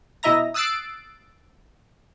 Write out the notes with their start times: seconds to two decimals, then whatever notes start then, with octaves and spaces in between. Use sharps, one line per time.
0.23 B2 E4 D#5 E5 A#5 A#6
0.54 D#6 E6 F#6 A6 C7 D7